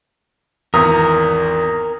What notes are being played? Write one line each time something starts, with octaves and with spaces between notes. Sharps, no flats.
G#1 E2 A#4 D#6